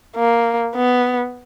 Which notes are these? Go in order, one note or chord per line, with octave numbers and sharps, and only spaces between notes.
A#3
B3